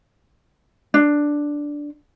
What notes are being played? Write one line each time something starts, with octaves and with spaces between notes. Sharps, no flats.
D4